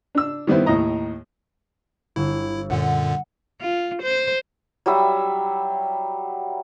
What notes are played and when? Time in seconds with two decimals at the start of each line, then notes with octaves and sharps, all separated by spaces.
0.15 D4 E6
0.47 D#3 G3 B3 C4 E4
0.66 D#2 A2 E4 D#5 A#5
2.16 G1 E4 E6 E7
2.70 F#2 A#2 D3 F#5
3.60 F4
4.02 C5
4.86 F#3 G3 E5